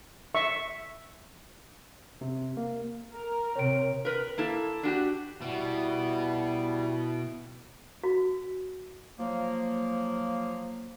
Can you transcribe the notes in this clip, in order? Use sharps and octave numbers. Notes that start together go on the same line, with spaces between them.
E5 C#6
C3
A#3
A#4
C3 C4 C#5 D7
A#4 B4
A#3 E4 A4
D4 F#4 G4
B2 G3 B3 E4
F#4
F3 F#3 A#3